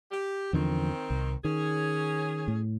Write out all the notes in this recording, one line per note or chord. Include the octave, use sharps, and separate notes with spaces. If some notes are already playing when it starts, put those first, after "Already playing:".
G4
E2 D3 D#3 F3 C4
C2
D#3 C#4 G#4
A2